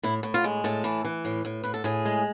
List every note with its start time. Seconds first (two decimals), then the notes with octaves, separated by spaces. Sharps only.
0.03 A2 E4
0.23 A2
0.34 F4
0.44 G#3
0.64 A2 A4
0.84 E3
1.05 E3
1.25 A2
1.45 A2
1.63 A2 B4
1.74 A4
1.84 A2 G#4
2.05 G#3